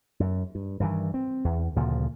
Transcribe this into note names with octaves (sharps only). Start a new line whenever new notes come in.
F#2
G2
G2 D#3 E3
C4
E2
D2 A#2 C#3 F3